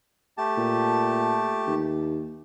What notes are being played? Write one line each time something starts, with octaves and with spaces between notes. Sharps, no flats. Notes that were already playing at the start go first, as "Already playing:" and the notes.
A3 G4 A5
A#2
D#2